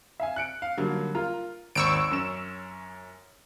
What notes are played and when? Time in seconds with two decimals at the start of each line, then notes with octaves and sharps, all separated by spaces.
0.20 E5 F5 G#5
0.36 F#6 C#7 D7
0.62 F5
0.78 D3 F#3 G3 A#3 D#4
1.15 F4 A#4 A#5
1.75 G#1 D#2 C#6 E6 D7
2.11 F#2 C#4 E7